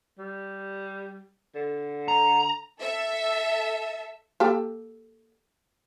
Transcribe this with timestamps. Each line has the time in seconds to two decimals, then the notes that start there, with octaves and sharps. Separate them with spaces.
0.18 G3
1.55 D3
2.08 A#5
2.80 A4 E5
4.40 A#3 G4 A4